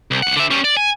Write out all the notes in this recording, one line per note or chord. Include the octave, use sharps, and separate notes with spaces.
C2
C2 F#5
D3 E5
G3 C#4
D5
G#5